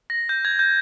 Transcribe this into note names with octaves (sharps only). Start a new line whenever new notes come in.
A#6
G6
G#6
G6